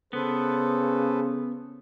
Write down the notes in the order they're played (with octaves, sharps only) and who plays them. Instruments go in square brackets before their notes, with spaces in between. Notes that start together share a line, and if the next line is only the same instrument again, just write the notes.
[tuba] C#3 [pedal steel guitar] B3 [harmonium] A4 B4 C5